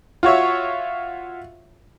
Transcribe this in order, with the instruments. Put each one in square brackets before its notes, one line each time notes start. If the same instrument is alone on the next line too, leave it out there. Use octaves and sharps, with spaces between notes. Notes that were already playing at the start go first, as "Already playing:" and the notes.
[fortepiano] F4 F#4 C#5 E5